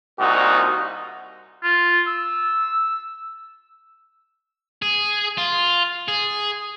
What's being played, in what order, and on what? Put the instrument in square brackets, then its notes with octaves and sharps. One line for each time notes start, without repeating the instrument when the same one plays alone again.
[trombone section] C2 A#2 D#4 F#4
[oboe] F4
E6
[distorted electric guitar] G#4
F4
G#4